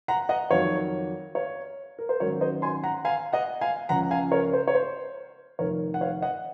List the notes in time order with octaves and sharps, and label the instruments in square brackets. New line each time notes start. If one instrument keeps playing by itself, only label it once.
[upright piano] F#5 A#5
D#5 F#5
F2 D#3 F#3 C#5 F5
C#5 F5
A#4
C5
G#1 G#2 F#3 C#4 A#4 C#5
C5 D#5
G#5 C6
F#5 A#5
F5 G#5
D#5 F#5
F5 G#5
C#2 C#3 F3 F#5 A#5
F5 G#5
A#4 C#5
C5
C#5
C5
F1 F2 D#3 A#4 C#5
F#5
C#5 F5
D#5 F#5